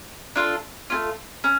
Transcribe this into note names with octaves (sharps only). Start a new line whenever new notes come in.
D4 F4 A4
A3 C#4 F4
C#4